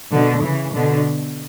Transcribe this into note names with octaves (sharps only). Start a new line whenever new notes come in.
B2 D3
C#3 E3
B2 D3